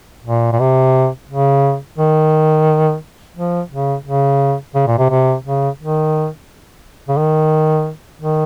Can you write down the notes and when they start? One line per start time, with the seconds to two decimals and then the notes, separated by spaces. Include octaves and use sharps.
0.25 A#2
0.52 A#2
0.60 C3
1.29 C#3
1.98 D#3
3.37 F3
3.71 C#3
4.06 C#3
4.75 C#3
4.87 A#2
4.99 C3
5.10 C3
5.45 C#3
5.79 D#3
7.08 C#3
7.18 D#3
8.21 D#3